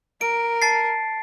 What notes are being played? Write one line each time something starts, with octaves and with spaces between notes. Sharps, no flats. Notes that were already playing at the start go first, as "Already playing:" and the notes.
A#4 D7
A5 A6 C7